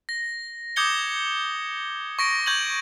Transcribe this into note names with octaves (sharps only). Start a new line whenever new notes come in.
A#6
D6 D#6 G6 G#6 C#7 G7
C#6 A#6 D7
C#6 G6 G#6 D#7 F#7